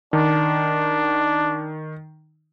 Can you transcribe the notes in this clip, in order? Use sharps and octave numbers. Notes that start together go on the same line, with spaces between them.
D#3 D4